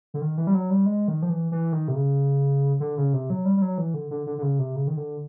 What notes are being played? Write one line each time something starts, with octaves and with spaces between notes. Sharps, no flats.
D3
D#3
E3
G3
F#3
G3
G#3
D#3
F3
E3
E3
D#3
C3
C#3
D3
C#3
C3
F#3
G3
G3
F#3
E3
D3
D3
D3
D3
C#3
C3
C#3
D#3
D3